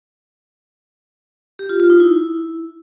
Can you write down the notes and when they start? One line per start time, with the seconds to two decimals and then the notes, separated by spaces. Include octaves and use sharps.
1.59 G4
1.69 F4
1.80 F4
1.90 D#4
2.00 E4